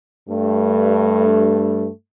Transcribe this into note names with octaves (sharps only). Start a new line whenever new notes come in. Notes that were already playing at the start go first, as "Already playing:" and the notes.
G2 A3